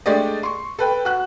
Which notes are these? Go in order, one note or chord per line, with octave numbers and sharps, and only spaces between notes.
G#3 A3 D4 G4 D5 D#5
C6 C#6
A4 B4 G5
F#4 F#6